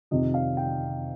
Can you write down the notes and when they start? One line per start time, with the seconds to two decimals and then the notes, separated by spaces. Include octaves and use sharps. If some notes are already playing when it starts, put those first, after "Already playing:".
0.11 F2 C3 D#3 D#5
0.34 F5
0.57 G5